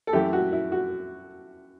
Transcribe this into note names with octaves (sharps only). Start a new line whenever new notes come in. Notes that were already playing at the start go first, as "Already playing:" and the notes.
A4
F#2 E3 A3 E4 G4
F#4
E4
F#4